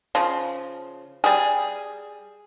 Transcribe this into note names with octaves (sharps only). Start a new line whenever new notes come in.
C#3 F3
G3 G#4